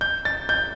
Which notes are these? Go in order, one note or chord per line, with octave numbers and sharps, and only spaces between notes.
G6
A6
G6